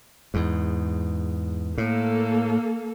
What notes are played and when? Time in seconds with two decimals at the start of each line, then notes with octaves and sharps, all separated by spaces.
0.34 E2 G#2
1.78 A2 A#3 A4